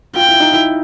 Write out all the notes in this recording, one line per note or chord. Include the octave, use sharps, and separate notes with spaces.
F4 G5
E4
D#4
E4